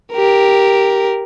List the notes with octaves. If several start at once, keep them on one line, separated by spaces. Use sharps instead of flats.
G4 A#4